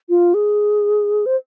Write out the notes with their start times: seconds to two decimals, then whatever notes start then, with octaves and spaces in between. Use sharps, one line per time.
0.09 F4
0.34 G#4
1.26 C5